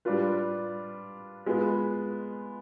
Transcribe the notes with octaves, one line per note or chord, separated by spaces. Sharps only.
G3 D4 F4 B4
G#3 B3 F4 B4